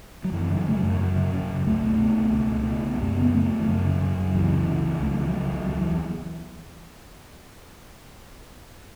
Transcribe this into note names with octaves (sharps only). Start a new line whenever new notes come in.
F#3
F#2 E3
C#3
E3
C#3 A3
F#3
F#2
F#2
C#3
C#3
F#2
C#2 A3
B2
B2
C#2
C#2
B2
B2
C#2
A3
F#2 B3
C#3
C#3 A3
F#2
E3
F#2 F#3
C#3
C#3
F#2
C#2 E3
C#3
C#3
C#2
C#2 A3
F#3
C#3 E3
F#3
C#3
C#2
E2 F#3
E3